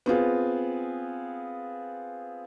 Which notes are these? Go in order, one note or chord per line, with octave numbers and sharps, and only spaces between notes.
B3 C4 F4 G#4